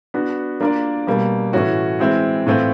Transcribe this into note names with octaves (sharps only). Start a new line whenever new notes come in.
B3 D4 F#4
A#3 D4 F4 A#4 D5
B2 G3 A#3
A2 E3 A3 C#4 F#4
E3 G#3 C4 E4
A2 E3 A3 C4 F4